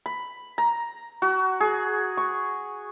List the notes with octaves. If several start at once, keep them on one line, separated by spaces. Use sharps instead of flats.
B5
A#5
F#4
G#4
C#6